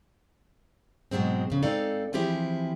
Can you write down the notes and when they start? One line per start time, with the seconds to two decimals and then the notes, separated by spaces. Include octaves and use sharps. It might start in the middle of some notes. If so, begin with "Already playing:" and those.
1.11 G#2 B2 F#3 G#3 C4
1.50 F2 C#3
1.62 G#2 C4 D#4 A4 D5 F5
2.13 E3 F3 C4 E4 G4 G#4